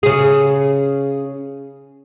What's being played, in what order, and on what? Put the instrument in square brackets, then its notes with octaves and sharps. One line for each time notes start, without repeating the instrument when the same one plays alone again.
[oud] C#3 G#4